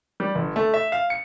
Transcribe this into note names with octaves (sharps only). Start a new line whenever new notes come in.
G3
G1
A3
E5
F5
C#7